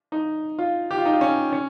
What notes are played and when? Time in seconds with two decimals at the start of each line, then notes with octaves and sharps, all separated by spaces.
0.12 D#4
0.59 F4
0.91 G4
0.98 F4
1.05 D#4
1.13 F4
1.21 C#4
1.52 C#4